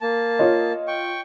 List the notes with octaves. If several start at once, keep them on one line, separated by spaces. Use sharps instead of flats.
A#3 A5
F4 C#5 D#5
G5 C#6